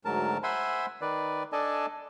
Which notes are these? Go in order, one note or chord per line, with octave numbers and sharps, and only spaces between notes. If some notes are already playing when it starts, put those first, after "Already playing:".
D2 G#2 F#3 A#4 A5
C5 E5 F#5 G#5 B5 C6
D#3 B4 D5
D4 A4 D5 D#5 G#5 A5